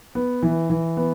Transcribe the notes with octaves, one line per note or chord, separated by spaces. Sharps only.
B3
E3
E3
B3